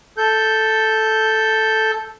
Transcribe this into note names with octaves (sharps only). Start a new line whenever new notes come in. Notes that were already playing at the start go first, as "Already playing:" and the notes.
A4 G6